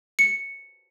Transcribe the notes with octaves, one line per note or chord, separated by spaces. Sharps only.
C#7